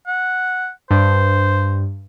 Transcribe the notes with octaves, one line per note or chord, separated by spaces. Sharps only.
F#5
G2 C5